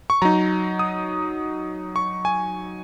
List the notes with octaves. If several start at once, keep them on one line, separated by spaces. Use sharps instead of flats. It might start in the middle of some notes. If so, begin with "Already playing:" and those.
C#6
F#3 D#4 A#5
D#6
C#6
G#5